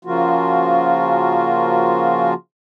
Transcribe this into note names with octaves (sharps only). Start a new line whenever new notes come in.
C#3 F3 A#3 F4 F#4